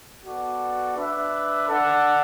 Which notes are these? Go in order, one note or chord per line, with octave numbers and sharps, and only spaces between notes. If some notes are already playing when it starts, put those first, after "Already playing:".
B3 F#4 A4 D5
D4 B4 E5
D4 A4 D5 F#5